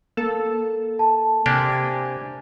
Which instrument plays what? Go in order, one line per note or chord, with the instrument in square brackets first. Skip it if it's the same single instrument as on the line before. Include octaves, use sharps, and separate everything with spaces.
[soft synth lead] A#3 [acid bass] A4
[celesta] A5
[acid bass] C3 [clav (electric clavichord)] A#3 D4 G4 [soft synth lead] G#5
[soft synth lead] G#5